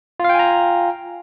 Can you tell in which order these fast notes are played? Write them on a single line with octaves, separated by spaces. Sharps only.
F4 F5 G5 G#5 A#5